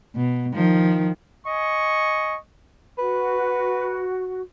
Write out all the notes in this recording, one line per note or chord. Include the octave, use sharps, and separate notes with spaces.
B2
D#3 F3
D#5 G#5 C#6
F#4 B4